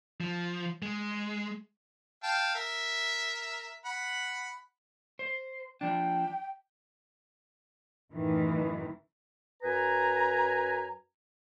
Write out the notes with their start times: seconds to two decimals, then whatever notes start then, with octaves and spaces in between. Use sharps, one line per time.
0.21 F3
0.82 G#3
2.23 F5 G5 A5
2.55 A#4 E5
3.85 F#5 B5
5.19 C5
5.81 F3 D4 G5
8.12 F#2 A2 D#3 E3
9.63 F#2 B4 G#5 A#5